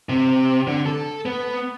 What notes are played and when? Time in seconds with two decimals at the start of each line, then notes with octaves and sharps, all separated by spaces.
0.09 C3
0.67 D3
0.86 A4
1.25 B3